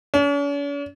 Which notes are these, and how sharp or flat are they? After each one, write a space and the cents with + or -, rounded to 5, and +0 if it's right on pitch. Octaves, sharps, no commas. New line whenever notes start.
C#4 +45